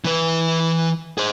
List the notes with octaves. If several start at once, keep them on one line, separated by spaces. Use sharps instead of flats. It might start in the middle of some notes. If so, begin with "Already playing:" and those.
E3 B4
G#4 C5